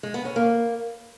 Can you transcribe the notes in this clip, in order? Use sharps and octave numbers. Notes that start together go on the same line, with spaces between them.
G#3
B3
C#4
A#3